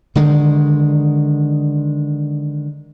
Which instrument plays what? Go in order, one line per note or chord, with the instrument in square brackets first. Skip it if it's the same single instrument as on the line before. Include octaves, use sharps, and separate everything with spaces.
[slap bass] D3 D#3 G#3